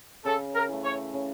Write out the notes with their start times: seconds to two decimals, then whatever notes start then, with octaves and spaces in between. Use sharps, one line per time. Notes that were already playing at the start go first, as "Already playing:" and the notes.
0.25 C#3 A4
0.55 A#4
0.69 E3 A3
0.84 C#5
1.14 C#3